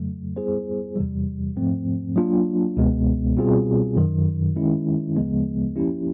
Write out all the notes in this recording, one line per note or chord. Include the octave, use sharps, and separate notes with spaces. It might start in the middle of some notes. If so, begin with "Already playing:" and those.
Already playing: F2 C#3 F#3 A3
G3 B3 E4 G#4 C5
E2 C3 E3 G3
G#2 F3 A3 C4
F#3 A#3 D4 F4
C#2 B2 G#3 B3
B2 G3 C4 F4 G#4
F#2 D#3 F#3
D#3 G#3 C#4 E4
D2 C#3 F3 G#3 B3
F3 A#3 C#4 E4 G4